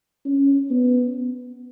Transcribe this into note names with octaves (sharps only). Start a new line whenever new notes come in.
C#4
B3